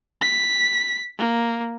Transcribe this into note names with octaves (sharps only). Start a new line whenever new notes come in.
B6
A#3